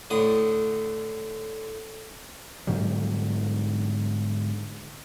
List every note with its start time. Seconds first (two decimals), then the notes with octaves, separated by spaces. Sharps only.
0.10 A2 D3 D#6
2.67 G#2 D3 F#3 G3